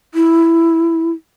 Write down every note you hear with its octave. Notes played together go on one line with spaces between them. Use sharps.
E4